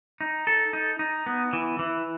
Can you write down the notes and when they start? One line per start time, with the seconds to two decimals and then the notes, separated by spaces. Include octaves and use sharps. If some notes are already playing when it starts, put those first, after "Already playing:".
0.20 D#4
0.47 A4
0.73 D#4
0.99 D#4
1.26 B3
1.53 E3
1.79 E3